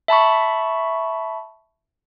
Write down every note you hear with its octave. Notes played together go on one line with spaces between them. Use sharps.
E5 A5 B5 C#6